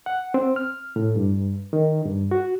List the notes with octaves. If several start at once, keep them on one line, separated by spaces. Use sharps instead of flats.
F#5
C4
F6
A2
G2
D#3
G2
F#4